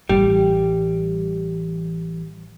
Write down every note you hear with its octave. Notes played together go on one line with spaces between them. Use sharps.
A1 E3 G3